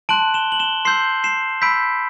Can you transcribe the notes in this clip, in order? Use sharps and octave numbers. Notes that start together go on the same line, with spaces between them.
A5 C6 F#6 D7 F#7
E7 G7
F#7
E7 G7
C6 E6 G6 C7 E7
C7 E7
B5 E6 G6 B6 D7